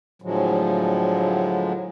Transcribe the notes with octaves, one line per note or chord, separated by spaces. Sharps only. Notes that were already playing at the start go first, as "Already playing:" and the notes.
A2 D3 F3 F#3 G#3